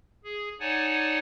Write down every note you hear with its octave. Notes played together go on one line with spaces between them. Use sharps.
G#4
D#4 C#5 D5 F#5 G#5 A5